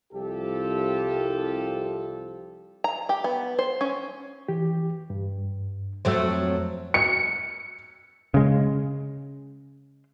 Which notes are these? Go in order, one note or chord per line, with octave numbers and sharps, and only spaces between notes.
C2 F3 G4 A4
A#5
G4
B3
C5
C#4
E3 G4
G2
F2 F#3 A3 C5 E6
C#7
C#3 G#3